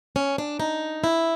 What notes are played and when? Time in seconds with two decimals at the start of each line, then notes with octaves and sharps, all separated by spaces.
0.16 C#4
0.38 D4
0.60 D#4
1.04 E4